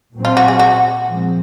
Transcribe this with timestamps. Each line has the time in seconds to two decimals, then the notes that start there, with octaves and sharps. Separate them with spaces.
0.13 A#2 F#3 C4
0.25 F4
0.37 F#4
0.48 G#4
0.59 F#4
1.06 A#2 F3 G#3 C4